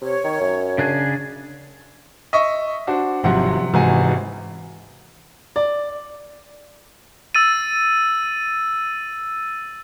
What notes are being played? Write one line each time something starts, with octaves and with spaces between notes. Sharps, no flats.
C3 C#5
D#3
F#2
C#3 D4 G#4
D#5 E5 C#6
D4 F#4 C5
G#1 C3 F3 F#3 F#5 C6
G#1 C3 E3 G#3 F#4 G#5
D5
E6 A6 D#7